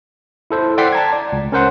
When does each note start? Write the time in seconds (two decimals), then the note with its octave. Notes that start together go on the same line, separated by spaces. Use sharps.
0.51 E4 A4 C5
0.78 D5 F#5 G5 C6 B6 C7
0.92 A5 A#5 G#6
1.13 D5
1.32 C#2
1.52 C#4 A#4 C5 F#5 C6